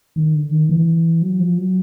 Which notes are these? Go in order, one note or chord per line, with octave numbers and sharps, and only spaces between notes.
D#3
D3
D#3
E3
F#3
F3
F#3